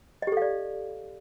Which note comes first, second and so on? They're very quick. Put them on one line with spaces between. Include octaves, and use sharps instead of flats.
D#5 G4 A4 F5 D5